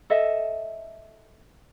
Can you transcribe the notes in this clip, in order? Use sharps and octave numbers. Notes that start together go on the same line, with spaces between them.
A4 D#5 E5